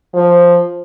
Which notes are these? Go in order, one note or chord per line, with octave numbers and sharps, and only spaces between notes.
F3